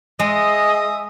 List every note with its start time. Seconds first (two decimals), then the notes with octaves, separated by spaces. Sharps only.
0.19 G#3 D#5 E5 D#6